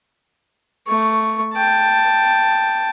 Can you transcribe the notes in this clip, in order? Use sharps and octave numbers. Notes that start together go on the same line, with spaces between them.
A3 C#6
G5 A5